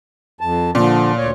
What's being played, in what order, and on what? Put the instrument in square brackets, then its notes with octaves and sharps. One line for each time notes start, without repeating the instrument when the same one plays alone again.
[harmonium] F2 A5
[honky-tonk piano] A#2 [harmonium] D3 F3
[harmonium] D2 C#5